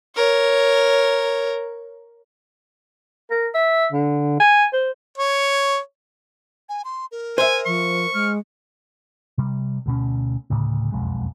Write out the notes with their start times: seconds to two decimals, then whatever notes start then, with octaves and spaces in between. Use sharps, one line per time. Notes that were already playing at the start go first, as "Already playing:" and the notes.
0.16 A#4 C#5
3.31 A#4
3.55 E5
3.92 D3
4.40 G#5
4.73 C5
5.18 C#5
6.69 G#5
6.84 C6
7.11 A#4
7.38 C5 E5 G#5
7.66 F3 C#6
8.14 G#3 F6
9.38 C3 G3
9.86 D2 B2 C#4
10.50 D2 A2 C#3
10.92 E1 B1 F2 G#3